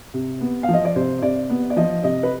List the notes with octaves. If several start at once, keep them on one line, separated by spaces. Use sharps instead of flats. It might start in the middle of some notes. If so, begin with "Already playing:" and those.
C3
B3
F5
F3
D#5
D5
C3 C5
C3 D5
B3
D5
F3 D#5
C3 D#5
B4